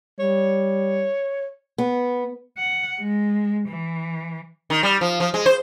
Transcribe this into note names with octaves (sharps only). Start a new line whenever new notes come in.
G3 C#5
B3
F#5
G#3
E3
D#3
G3
F3
F3
G#3
C5